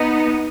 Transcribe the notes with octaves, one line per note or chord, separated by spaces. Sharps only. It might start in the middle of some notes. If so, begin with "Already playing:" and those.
Already playing: B3 D#4